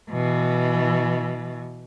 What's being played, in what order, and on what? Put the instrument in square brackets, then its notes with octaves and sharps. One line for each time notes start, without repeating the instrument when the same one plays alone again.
[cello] B2 E3